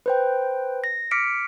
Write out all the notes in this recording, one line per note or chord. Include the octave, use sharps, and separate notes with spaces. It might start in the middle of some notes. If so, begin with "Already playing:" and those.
B4 C5 G5
A#6
D6 F6 B6 C#7 D7